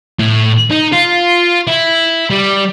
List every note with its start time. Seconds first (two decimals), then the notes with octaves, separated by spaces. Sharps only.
0.19 A2
0.71 D#4
0.92 F4
1.68 E4
2.30 G3